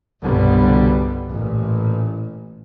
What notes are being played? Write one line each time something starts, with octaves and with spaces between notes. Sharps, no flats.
G1 C2 B2 D3 G3 B3
A1 A#2